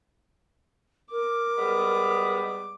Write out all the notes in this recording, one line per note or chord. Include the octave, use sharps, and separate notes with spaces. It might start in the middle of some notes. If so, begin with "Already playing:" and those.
A#4 D6
G3 G#3 B3